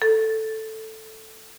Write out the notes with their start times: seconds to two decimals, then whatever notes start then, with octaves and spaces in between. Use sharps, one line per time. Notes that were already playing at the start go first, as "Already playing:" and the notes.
0.02 A4